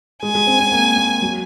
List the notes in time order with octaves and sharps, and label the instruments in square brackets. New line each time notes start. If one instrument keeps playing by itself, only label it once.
[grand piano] G#3 [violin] G#5
[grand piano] G#3
C4
C4
A#3
A#3
F#3